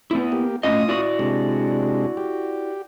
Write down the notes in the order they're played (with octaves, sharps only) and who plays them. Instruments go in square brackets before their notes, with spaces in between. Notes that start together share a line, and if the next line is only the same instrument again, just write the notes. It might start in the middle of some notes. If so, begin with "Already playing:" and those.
[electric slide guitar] B3 E4
[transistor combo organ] A#3 G4
[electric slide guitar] A2 C#4 D#5 [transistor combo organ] F4 D#6
[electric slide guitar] E4 F#4 D5
[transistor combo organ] C3 G#3 D4
G4